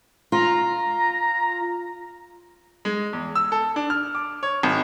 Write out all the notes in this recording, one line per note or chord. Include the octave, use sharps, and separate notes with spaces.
F4 A#5
G#3
E2
E6
A4
D4
F6
D6
C#5
G#1